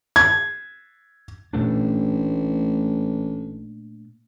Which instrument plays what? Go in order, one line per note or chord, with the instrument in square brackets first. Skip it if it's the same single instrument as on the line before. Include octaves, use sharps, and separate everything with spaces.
[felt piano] G#6
[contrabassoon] A1 [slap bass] A#2 A3 D4